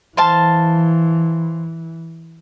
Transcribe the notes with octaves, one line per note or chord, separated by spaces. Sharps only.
E3 C5 F5 A5